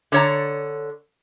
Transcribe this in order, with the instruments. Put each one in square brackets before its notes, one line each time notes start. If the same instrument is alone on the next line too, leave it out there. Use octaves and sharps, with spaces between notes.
[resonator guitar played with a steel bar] D3 C#5 A#5